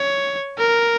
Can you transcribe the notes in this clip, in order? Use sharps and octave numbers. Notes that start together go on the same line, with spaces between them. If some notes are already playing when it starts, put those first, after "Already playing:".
Already playing: C#5
A#4